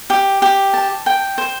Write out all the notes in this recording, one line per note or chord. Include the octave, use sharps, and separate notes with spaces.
G4
G4
A5
G5
C5